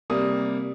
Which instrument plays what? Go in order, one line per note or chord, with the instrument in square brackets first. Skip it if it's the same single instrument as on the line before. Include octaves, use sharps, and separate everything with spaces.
[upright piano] C3 G3 A#3 D#6